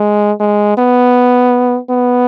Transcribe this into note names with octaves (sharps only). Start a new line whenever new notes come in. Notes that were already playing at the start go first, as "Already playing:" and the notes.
Already playing: G#3
G#3
B3
B3